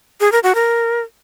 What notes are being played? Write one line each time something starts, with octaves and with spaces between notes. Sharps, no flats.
G#4
A#4
F#4
A#4